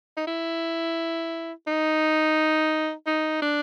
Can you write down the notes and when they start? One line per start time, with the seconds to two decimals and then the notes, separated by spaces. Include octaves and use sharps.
0.17 D#4
0.27 E4
1.67 D#4
3.06 D#4
3.42 D4